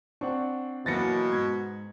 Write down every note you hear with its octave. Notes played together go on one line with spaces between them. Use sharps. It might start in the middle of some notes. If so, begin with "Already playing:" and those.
C4 D4 F#5 C#6
B2 E3 F#3 A#3 A6 A#6 C#7
G#2 G#6